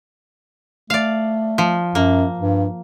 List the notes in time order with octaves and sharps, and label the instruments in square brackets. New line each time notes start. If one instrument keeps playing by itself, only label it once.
[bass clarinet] A3 [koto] D5 F5
[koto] F3
[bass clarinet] F#2 [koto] A#3
[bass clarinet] G2